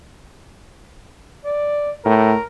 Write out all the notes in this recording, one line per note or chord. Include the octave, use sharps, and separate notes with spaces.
D5
A2 A#4